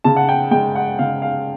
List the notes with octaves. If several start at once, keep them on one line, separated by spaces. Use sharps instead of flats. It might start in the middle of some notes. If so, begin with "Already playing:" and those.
C#3 A5
F#5
G5
G#3 G5
F#5
C#3 F5
F5